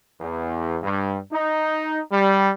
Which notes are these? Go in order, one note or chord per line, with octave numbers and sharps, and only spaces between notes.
E2
G2
D#4
G3